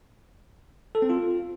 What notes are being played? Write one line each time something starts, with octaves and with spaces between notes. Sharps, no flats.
A4
C4
F4